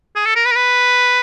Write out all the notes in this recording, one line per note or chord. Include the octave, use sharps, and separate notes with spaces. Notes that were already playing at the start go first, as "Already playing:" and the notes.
G#4
A4
A#4
B4
A#4
B4